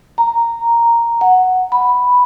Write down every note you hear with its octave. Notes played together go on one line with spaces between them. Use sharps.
A#5
F#5
B5